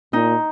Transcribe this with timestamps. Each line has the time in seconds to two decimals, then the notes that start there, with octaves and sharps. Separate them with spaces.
0.13 A#2 D#4